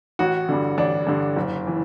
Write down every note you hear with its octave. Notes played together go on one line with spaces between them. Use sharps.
A1 F#4
G2 D3
A1 D4
G2 D3
F#1
E3